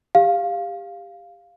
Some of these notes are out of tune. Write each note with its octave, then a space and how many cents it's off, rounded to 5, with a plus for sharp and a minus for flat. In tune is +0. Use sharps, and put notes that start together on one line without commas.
G4 +25 F5 +0